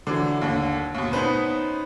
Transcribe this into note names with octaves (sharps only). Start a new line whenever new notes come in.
D3 E3 F#3
D#2 D3
D#2 B2
B3 C#4 D#4 B4 C5